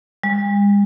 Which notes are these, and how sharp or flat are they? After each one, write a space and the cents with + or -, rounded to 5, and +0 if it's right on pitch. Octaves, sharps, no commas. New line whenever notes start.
G#3 -45